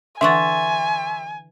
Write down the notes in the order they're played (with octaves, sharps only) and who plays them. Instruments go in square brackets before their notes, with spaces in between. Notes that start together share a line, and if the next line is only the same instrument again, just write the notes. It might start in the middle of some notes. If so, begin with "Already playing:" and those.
[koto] D3 E3 F#5 [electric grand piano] E5 [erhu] G#5 [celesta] C6 C#6 A6